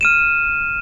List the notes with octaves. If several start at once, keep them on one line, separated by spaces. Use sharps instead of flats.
F6 D#7 E7